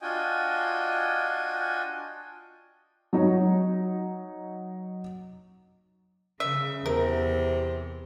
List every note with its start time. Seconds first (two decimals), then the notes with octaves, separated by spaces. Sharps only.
0.02 D4 F4 F#4 D#5 G5 G#5
3.13 F#3 D#4 C#5
6.40 C#3 E5
6.86 E2 C3 A#4